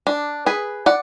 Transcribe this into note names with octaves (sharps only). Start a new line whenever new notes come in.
D4
G#4 B4
D5 F#5